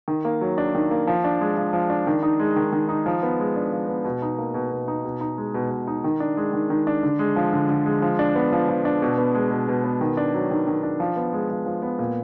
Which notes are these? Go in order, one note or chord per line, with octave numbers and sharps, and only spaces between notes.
D#3
A#3
F#3
D4
D#3
A#3
F3
D4
G#3
F3
F3
D4
D#3
D#4
G#3
D#3
D#3
D#4
F3
B3
G#3
D4
F3
B3
B2
D#4
A#3
B2
B2
D#4
B2
D#4
G#3
B2
B2
D#4
D#3
D4
G#3
D#3
D#3
D4
D3
G#3
F3
D3
D3
G#3
F3
D4
B3
F3
F3
D4
B2
B3
G#3
B2
B2
B3
D#3
D4
F#3
D#3
D#3
D4
F3
B3
G#3
F3
F3
B3
A#2